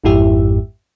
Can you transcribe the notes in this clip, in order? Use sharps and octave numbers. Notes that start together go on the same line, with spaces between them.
G#1 F2 G#2 E4 G4 E5